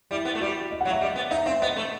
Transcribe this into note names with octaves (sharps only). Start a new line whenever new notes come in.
G3 E4
B3
A3
G3 F#4
D#5
F#5
F#3
E5
G3 D#5
B3
D#4 E5
C4 E5
B3 D#5
A3